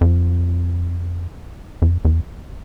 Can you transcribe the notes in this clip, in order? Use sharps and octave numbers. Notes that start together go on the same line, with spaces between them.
F2
F2
E2